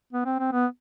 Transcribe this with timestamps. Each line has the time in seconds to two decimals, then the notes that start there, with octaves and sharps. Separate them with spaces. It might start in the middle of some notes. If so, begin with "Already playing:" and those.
0.13 B3
0.25 C4
0.39 C4
0.52 B3